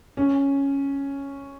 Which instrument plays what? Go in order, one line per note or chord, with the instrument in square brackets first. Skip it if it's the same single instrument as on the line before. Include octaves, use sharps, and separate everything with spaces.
[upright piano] C#4